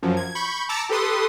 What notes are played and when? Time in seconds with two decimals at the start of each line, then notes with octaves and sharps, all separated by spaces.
0.02 F#2 F3 F#3
0.17 G#6
0.35 B5 C#6 G6
0.69 A5 A#5 D6 E6 A6 C#7
0.89 G4 A4 B4 C6 D#6